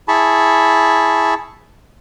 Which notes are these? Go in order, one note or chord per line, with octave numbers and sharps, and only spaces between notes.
E4 G#4 A5 B5 C#6